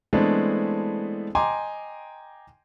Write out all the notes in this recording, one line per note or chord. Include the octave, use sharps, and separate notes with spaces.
E3 G#3 A3 B3 C4 D4
D#5 G5 G#5 A#5 C6 D6